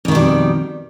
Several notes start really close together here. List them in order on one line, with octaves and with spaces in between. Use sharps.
F2 D#3 B2 G3